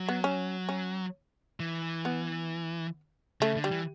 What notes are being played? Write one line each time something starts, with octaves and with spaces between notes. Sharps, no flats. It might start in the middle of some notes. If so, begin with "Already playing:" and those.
Already playing: F#3
B3
C#4
C#4
E3
B3
C#3 A3
D3
G3
E3